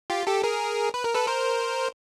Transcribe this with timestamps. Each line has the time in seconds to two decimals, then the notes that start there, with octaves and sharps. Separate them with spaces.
0.10 F4 G4
0.27 G4 A4
0.43 G#4 A#4
0.94 B4
1.04 A#4
1.14 A4 B4
1.27 A#4 C5